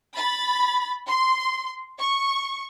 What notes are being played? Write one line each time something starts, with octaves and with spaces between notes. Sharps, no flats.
B5 A6
C6
C#6